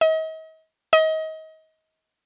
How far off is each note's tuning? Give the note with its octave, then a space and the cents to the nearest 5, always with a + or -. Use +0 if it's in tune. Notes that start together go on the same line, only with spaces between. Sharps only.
D#5 +40
D#5 +30